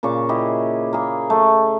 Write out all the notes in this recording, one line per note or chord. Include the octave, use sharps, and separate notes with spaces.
A#2 C#3 C#6 D6
E4 G4 G#4 D#5
A#3 G#4
A3